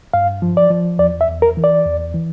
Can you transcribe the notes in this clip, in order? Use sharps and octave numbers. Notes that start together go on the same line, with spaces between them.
G2 F5
F3
D5
F3
E2 D5
E5
E2
A#4
E3
D5
E2
E3